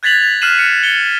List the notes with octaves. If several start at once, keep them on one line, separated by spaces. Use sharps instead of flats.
F#6 G#6 A6 B6 F7 F#7
F6 F#6 C7 D#7 E7 F#7
C#7
C#7 G7